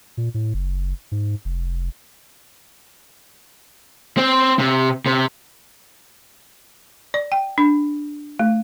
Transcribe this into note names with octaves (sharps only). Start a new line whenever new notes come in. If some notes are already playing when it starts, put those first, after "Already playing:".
A#2
A2
F#1
G#2
F1
C4
C3
C3
D5
G5
D4
A3